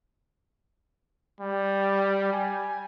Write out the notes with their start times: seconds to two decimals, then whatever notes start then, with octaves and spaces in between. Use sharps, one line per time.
1.40 G3
2.33 G#5